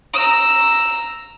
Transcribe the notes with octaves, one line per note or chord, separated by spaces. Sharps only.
A#5 E6